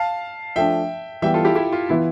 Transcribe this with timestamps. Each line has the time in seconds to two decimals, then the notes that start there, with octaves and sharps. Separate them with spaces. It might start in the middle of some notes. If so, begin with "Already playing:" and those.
Already playing: F5 A5
0.56 F3 A3 D4 E5 G5
1.22 E3 G3 B3 E5 G5
1.34 F4 A4
1.45 E4 G4
1.56 E4 G4
1.72 F4
1.89 E3 B3 E4 F4